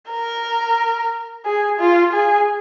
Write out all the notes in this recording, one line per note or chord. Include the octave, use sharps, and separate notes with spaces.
A#4
G#4
F4
G#4